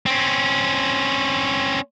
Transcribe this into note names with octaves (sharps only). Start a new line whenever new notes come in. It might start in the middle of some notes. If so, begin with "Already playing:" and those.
C4 C#4